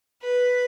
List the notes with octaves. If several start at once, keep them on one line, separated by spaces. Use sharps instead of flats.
B4